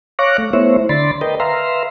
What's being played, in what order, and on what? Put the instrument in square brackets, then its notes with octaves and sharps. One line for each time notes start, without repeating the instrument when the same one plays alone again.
[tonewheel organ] C#5 F5 C#6 D6 F#6 A#6
A3
A3 B3 E4 C5 C#5 E5
D3 D5 B5 C6 A6
A#4 B4 D#5 G5
B4 E5 F5 A#5 C6